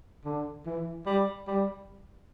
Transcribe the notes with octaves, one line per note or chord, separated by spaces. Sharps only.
D3
E3
G3
G3